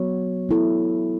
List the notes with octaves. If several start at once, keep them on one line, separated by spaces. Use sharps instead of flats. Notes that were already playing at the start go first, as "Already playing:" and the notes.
Already playing: F#3 B3 F#4 C#5
B3 E4 A4